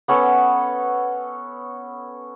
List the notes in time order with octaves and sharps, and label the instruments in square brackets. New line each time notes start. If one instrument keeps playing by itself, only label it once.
[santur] B3 C#4 A4 C#5